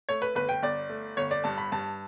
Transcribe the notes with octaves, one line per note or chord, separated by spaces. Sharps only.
A3 C#5
B4
G1 B4
G5
G1 D5
A3
G1 C#5
D5
G2 A5
B5
G2 A5